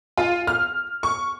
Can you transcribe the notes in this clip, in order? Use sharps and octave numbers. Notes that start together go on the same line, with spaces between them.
F4
F6
C#6